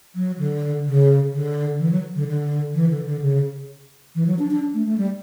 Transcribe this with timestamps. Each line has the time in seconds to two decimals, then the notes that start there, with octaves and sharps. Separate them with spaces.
0.15 F#3
0.39 D3
0.86 C#3
1.33 D3
1.80 E3
1.91 F#3
2.16 D3
2.28 D3
2.74 E3
2.90 D3
3.06 D3
3.22 C#3
4.15 E3
4.27 F#3
4.39 D4
4.51 D4
4.74 A3
4.86 A3
4.98 G3